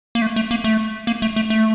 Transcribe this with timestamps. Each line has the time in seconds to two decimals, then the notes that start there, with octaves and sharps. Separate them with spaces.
0.15 A#3
0.22 A3
0.36 A3
0.51 A#3
0.64 A3
1.07 A#3
1.22 A3
1.36 A3
1.50 A3